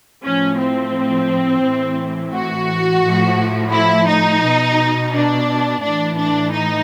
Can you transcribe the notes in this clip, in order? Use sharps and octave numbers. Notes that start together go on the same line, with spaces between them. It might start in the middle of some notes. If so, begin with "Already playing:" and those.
A2 F3 C#4
C4
A2 E3
F#4
A2 F3
E4
D#4
B2
D4
A2 E3 D4
D4
D#4